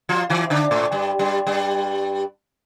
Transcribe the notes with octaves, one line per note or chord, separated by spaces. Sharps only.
F3 F4
E3 E4
D3 D4
A2 A3
G2 G3
G2 G3
G2 G3